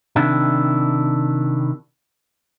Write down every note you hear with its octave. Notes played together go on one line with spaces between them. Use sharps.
C3 D#3 D4 E4